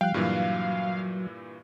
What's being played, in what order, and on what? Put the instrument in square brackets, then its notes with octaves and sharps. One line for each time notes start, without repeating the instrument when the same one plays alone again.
[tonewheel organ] F3 G3 [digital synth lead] F5 [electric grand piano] G5 F#6
[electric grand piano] G2 A#2 E3 [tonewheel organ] F#3